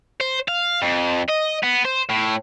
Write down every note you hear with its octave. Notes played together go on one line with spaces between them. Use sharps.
C5
F5
F2
D#5
B3
C5
A2